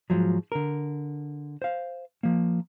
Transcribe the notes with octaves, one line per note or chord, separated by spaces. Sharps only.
G#2 B2 F3 F#3
D3 A#4
C5 F5
F3 A#3